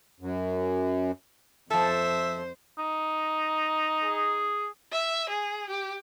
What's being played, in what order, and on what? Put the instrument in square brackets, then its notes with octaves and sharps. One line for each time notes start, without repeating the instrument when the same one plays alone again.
[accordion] F#2
[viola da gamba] F2 C5 [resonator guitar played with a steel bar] F3 A4 [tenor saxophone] E5
[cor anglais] D#4
[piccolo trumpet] G#4
[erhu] E5
G#4
G4